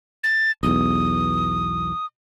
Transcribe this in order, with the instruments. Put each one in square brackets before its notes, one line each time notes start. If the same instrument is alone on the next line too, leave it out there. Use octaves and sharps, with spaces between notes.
[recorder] A6
[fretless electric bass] B1 E2 [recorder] D#6